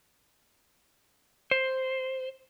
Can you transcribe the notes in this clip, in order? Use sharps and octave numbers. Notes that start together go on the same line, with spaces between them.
C5